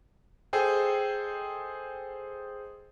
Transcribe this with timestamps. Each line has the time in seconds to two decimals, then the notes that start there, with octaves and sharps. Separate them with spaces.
0.53 G#4 A4 C5 D#5 G5